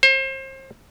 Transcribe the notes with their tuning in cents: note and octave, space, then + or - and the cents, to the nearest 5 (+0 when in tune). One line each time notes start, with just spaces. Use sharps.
C5 +35